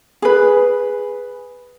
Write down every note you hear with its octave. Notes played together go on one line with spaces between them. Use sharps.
G#4 B4